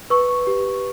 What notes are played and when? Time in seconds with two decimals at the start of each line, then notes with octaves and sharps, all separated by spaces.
0.10 B4 C#6
0.47 G4